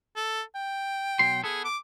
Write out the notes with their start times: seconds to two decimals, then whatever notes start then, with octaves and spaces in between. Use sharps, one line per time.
0.16 A4
0.55 G5
1.19 B2 F#3 C6
1.44 B3 G#4 A4
1.65 D6